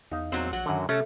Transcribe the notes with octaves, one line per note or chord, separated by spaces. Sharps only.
E2 D#4 F5
E2 A#2 F#3 C4
A#1 F#3 F#4
F#2 D3 D#3
C3 A3 C#4 A4